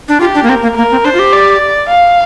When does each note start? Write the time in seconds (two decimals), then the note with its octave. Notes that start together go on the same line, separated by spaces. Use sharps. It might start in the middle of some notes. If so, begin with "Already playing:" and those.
0.09 D4
0.20 F4 G4
0.35 D4
0.44 A#3
0.49 C4 A#4
0.62 A#3
0.76 A#3 A#4
0.91 C4
1.04 D4 C5
1.14 F4
1.19 G4
1.33 D5
1.89 F5